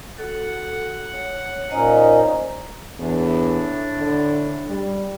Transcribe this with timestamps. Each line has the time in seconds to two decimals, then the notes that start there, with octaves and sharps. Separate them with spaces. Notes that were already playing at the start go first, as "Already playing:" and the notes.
0.18 F#4 A4 F#5
1.13 C#5
1.70 A#2 C#4 D#4 C5 D#5 A#5
2.99 E2 A2 D4
3.98 D3
4.67 G3